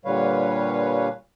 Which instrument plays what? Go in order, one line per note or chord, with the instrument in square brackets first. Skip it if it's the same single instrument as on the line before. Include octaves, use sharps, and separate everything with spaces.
[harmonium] A#2 D3 G3 B4 C#5 F5